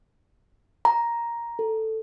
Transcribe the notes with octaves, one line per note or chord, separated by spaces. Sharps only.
A#5
A4